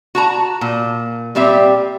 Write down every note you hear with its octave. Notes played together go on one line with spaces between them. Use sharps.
F#4 A5 A#5
A#2
A#2 G3 C4 G4 E5